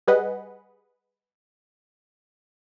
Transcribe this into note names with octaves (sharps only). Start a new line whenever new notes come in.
G3 G#4 B4 D#5 F#5